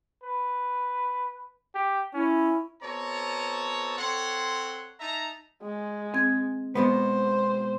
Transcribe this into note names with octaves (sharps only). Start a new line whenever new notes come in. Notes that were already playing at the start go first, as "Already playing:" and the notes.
B4
G4
C#4 E4
B2 C4 A4 C#5 A5 A#5
C4 A4 C#5 F#5 C6
D#4 E5 A5 A#5
G#3
C4 G#6
B2 G#3 B3 C5